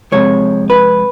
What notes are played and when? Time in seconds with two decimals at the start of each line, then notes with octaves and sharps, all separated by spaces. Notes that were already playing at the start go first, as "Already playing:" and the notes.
0.12 F2 C3 F3 G#3 C#5
0.70 B4